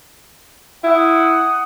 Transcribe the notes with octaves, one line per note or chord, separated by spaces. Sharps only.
E4 F#5 D#6